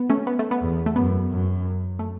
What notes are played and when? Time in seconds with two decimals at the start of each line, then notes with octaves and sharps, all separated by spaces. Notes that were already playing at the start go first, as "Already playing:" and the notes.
Already playing: B3
0.10 A3 C#4
0.27 B3
0.39 A3
0.51 B3
0.62 E2
0.86 A3
0.96 F#2 B3
1.31 F#2
1.99 A3